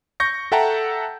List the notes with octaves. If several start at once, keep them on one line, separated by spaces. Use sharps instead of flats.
C#6 G6 A#6 C#7
A4 E5 F#5 G5 A5 A#5